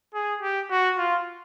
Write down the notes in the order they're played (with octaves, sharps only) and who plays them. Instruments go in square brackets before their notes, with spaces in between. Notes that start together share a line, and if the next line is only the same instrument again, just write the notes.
[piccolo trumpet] G#4
G4
F#4
F4